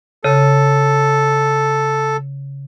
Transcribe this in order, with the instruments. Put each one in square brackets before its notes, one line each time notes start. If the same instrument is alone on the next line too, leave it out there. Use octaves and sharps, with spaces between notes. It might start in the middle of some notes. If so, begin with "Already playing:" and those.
[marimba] C#3 [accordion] A4